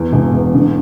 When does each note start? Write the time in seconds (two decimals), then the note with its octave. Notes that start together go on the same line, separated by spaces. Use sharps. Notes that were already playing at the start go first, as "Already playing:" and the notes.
Already playing: E2
0.13 E1
0.33 E2
0.54 D3